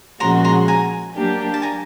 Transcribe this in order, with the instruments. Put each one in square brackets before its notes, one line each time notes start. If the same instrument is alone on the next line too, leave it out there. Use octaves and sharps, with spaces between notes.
[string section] A#2 F3 G#3 C#4 F#4 [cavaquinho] A#5 C6
[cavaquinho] A#5 C6
G#5 A#5
[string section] F#3 A#3 D4 G4
[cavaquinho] A5
G#5 A#5